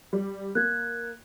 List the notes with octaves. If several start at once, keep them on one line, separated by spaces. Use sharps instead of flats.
G3
A#3 F#6 G#6